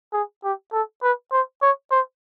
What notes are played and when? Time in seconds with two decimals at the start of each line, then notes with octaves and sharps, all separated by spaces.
0.13 G#4
0.44 G4
0.73 A4
1.03 B4
1.32 C5
1.62 C#5
1.91 C5